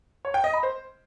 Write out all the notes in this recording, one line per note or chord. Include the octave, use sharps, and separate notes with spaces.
C#5
G5
D#5
B5
C5